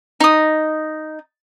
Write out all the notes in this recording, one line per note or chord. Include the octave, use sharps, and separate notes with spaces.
D#4 D#6